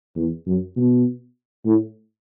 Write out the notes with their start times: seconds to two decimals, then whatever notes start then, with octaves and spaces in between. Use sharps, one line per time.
0.16 E2
0.47 F#2
0.76 B2
1.65 A2